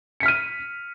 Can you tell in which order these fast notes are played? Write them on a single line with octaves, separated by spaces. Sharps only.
C#7 B6 F6 D#7